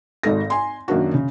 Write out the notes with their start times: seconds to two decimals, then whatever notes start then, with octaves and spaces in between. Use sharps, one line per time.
0.23 G#1 G#2 A4 A#6
0.50 G#5 C6
0.88 F#2 D#3 A#3 D4 F#4
1.14 C#3